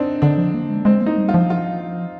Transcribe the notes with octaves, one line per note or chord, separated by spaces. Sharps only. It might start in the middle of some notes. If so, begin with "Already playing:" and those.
Already playing: C4 D4 D#4
D3 D4
F3
A#3
G#3
G#3 C4
A#3
D#4
G3
F4
F3
F4